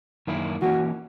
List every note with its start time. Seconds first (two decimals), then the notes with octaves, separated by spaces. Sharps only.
0.27 F#2 D#3 A#3 E4
0.62 E3 A#3 C#4 F#4